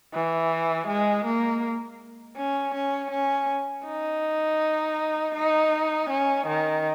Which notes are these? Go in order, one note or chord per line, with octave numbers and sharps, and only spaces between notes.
E3
G#3
A#3
C#4
C#4
C#4
D#4
D#4
C#4
D#3